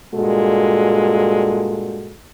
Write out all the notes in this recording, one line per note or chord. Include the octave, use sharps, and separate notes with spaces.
G2 A#2 G#3 F#4 A4